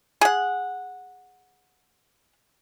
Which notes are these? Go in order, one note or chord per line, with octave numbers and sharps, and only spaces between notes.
G#4 F#5